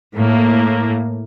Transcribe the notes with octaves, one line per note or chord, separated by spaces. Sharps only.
A2 A#3